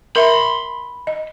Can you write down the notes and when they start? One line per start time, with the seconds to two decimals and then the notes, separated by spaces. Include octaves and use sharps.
0.16 A#4 E5 B5 C6
1.07 D#5